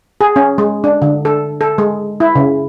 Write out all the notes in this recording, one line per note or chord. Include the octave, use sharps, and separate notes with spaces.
G#4
C#4
G#3
D4
D3
A4
A4
G#3
E4
C#3